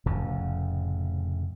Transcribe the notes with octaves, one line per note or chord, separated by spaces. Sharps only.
F1 A2 C#3